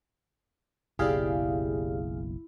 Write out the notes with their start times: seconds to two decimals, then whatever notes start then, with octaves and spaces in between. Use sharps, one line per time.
0.99 F#1 B1 E4 G4 G#4 D5 F5